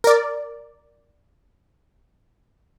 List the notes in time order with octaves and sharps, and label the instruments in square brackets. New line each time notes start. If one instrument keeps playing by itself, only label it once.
[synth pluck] A#4 D5